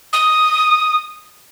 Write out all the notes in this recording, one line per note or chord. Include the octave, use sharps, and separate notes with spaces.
D#6